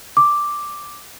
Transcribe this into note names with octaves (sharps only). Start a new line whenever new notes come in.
D6